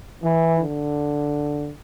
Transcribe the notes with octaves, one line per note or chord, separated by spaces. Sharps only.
E3
D3